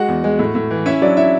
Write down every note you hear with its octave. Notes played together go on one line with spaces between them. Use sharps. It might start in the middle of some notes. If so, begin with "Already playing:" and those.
Already playing: G#3 F#4 F#5
E2
G#3
A2
A2
E3
C#4 E4 E5
F#3 D4 D5
C#4 E4 E5